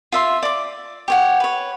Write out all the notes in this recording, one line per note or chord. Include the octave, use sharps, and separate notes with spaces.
F4 E5 C6
D5 D6
G4 C#5 F#5
B4 C#5